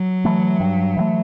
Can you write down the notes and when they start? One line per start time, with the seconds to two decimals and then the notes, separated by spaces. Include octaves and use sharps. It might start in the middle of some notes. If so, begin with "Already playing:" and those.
Already playing: F#3
0.25 E3 A3
0.60 G2
0.97 E3 A3